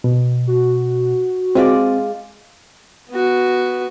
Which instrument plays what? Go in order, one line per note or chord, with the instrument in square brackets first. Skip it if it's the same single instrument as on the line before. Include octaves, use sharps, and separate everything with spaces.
[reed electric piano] B2
[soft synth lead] F#4
[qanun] G#3 F4 D5 [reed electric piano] C4
[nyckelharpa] B3 F#4